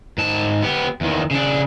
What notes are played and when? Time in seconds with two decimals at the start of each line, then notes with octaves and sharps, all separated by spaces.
0.18 G#2 A5
0.62 B3 G4
1.01 E2 D#3
1.31 C#3 D4